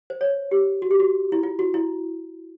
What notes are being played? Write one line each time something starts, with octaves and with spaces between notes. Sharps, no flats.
C5
C#5
G4
F#4
G4
F#4
E4
F4
F#4
E4